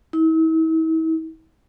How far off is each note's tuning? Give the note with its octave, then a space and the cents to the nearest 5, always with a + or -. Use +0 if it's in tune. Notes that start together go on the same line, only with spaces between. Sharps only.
E4 -45